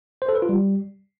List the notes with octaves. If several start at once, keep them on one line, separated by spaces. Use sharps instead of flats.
C5
A4
B4
F4
G3